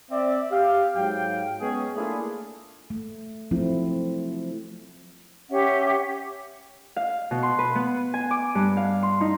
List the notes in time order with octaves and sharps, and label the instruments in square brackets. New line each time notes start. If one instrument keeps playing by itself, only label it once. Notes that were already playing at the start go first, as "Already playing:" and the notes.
[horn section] C4 D5 E5
G4 F5
G#2 F#3 F5 G5
G#3 B3 C#4 G#4
A3 A#3 D4 E4 F4 G#4
[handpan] A3
F3 F#3 A3 C4 E4 F4
[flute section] C#4 G4 E5 F#5
[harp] F5
B2
C6
B4
B3
G#5
D6
G2
F5
C6
D#4